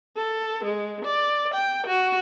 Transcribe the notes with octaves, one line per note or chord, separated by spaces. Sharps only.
A4
G#3
D5
G5
F#4